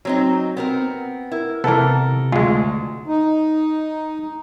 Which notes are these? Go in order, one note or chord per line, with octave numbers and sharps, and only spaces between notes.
F#3 C4 D#4
B3 C4 A#4
E4 A#4
C3 E3 B3 A4 A#4
D2 G#3 F4
D#4